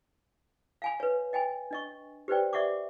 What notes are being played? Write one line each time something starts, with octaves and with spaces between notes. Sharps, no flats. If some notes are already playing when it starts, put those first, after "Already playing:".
F5 G#5 B5
B4 C#5
D#5 G5 G#5 B5
D4 D#5 C#6
G4 B4 C5 D5 G5
D5 E5 F#5 C#6 D6